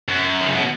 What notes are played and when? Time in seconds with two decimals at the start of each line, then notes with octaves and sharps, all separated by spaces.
0.09 F#2
0.41 D#3
0.48 C#3
0.55 B2